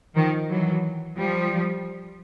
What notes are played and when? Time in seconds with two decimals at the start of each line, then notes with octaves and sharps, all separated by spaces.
0.15 D#3 F3
0.49 E3 F#3
1.17 F3 G3